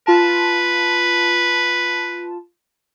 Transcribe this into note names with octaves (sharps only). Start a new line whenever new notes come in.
F4 B4 A5